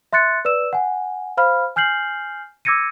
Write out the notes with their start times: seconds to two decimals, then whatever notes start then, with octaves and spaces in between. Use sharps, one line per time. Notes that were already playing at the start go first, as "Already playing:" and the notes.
0.13 E5 C6 F#6 A6 C#7
0.45 B4 D5 E6 E7
0.73 F#5 G#5
1.37 C5 F5 B5 F6
1.76 G#5 F6 G6 C7 F#7
2.65 D6 E6 G#6 A#6 C#7 D#7